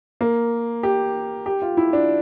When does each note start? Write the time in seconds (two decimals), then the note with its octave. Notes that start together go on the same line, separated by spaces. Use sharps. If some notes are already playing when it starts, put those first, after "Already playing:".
0.21 A#3
0.83 G4
1.46 G4
1.62 F4
1.77 E4
1.93 D4